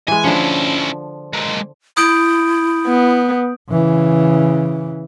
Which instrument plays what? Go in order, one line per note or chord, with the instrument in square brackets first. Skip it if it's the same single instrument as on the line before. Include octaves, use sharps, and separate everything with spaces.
[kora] E3 G#3 [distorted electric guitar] G#5
[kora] D3 F3 [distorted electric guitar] C#4 E4
[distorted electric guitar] G#3 A#3
[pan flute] E4 [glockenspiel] D#6 G6 D7
[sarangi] B3
[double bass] C#3 E3